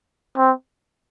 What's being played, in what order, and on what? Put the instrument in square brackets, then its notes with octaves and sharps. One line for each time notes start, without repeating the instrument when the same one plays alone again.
[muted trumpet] C4